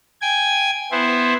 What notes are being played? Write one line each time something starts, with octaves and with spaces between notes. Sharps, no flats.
G5 G#5 G#6
B3 E4 C5